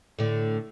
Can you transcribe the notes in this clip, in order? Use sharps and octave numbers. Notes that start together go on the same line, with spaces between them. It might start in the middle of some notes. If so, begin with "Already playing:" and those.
A2 D3